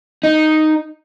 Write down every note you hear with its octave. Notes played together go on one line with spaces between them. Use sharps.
D#4